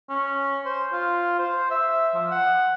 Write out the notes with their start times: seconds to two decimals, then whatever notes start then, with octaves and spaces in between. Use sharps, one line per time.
0.09 C#4
0.66 C5
0.93 F4
1.39 C5
1.71 E5
2.15 F3
2.31 F#5